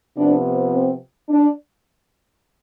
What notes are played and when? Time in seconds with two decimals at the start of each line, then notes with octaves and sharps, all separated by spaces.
0.15 C3 F3 B3 D4
0.73 C4
1.29 D4